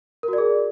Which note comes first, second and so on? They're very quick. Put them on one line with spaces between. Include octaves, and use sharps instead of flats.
A#4 F#4 D5 G#4